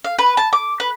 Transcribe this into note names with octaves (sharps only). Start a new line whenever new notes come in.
F5
B4
A5
D6
B4